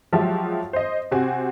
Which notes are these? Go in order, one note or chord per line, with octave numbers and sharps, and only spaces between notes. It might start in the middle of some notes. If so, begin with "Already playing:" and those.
F3 F#3 G#3 F4 G4 E5
C5 D#5
C3 C4 F#4 G#5